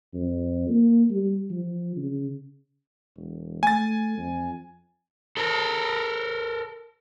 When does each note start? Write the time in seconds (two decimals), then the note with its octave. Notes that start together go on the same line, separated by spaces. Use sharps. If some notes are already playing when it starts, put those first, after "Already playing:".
0.14 F2
0.69 A#3
1.11 G3
1.51 F3
1.97 C#3
3.16 E1
3.63 A3 G#5 A6
4.18 F2
5.37 A4 A#4